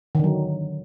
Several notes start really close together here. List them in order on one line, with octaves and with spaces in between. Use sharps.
D#3 D3 F#3